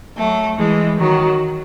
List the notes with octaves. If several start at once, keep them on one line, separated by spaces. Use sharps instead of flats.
F#3 A3
E3 G#3
D#3 F#3